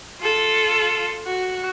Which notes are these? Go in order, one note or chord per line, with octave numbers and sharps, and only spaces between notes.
F4 A4
F#4